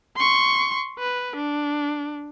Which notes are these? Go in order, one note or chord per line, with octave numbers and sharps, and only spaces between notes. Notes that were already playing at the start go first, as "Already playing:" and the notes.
C6 C#6
B4
D4